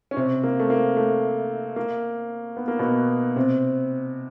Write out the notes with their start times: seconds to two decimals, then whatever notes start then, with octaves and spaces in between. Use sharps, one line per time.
0.11 C#4
0.17 C3 C4
0.44 A#3
0.60 A3
0.70 A#3
0.97 A3
1.76 A#3
2.57 B3
2.68 A#3
2.79 B2 B3
3.36 C3 C4